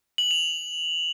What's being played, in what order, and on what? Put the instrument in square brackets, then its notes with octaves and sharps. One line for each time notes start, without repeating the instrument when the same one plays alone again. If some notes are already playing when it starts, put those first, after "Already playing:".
[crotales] F#7
F7